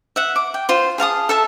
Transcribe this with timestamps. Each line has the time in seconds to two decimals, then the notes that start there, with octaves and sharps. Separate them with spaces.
0.16 E5 F#5
0.36 D6
0.54 G5
0.69 F4 C5
0.98 G#4 F5 A5 D#6
1.29 A4 E5 A5